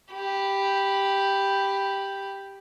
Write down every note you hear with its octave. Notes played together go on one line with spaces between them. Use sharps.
G4 B5